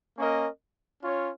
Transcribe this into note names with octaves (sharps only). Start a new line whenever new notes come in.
A#3 C#4 A#4 D#5
C#4 F4 C#5